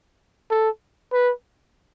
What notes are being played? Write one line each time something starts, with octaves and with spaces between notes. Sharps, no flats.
A4
B4